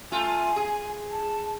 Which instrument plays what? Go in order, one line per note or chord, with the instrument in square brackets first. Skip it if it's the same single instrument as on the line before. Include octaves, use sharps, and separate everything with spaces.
[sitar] A3 F4 [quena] G#5
[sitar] G#4
[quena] A5